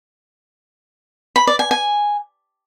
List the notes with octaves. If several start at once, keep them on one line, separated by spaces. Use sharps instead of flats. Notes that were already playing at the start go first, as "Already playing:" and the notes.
B5
D5
G#5
G#5